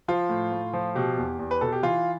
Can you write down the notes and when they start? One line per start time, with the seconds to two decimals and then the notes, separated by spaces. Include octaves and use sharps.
0.08 F3 F4
0.29 A2
0.52 A2
0.73 F3
0.95 B2 G4
1.18 E2
1.39 E2
1.51 B4
1.61 B2 A4
1.72 G4
1.83 E3 F4